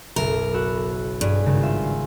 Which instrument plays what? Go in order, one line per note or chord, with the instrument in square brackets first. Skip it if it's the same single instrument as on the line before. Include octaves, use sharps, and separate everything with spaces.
[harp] F#1 B1 E5 [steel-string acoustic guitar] A#4
[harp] F#4 B5 E6
[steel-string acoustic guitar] G2 [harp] G#4 G#5
[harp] G#1 C#3
F4 E5 C6